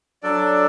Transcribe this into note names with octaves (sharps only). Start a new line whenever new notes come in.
F#3 D4 A4 D5